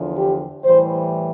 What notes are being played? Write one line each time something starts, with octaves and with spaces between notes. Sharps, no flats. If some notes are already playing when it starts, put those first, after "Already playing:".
Already playing: E2 D3 F3
G4
A2 E3 G3 C5